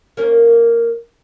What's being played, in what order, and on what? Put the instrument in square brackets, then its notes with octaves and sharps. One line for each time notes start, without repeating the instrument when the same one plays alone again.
[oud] A#3 C#4 A#4